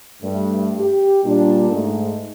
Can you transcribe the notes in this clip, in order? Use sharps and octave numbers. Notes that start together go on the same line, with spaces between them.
G2 A3
G4
A#2 G3 D4
G#2 A3